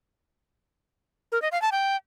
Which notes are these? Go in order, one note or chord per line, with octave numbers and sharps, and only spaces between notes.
A#4
D#5
F5
A5
G5